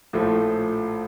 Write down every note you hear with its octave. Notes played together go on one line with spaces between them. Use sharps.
A#1 A2 F3 A3